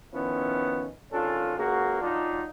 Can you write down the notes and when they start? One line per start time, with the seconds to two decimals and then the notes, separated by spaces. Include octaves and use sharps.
0.13 D#3 F3 B3 C#4 E4
1.12 G#1 C#4 D4 F4 A4
1.57 C#2 F#3 A#3 F#4 G#4
2.01 F#3 D4 D#4 F4